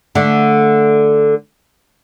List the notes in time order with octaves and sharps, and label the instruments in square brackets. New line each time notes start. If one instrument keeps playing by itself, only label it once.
[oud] D3 A3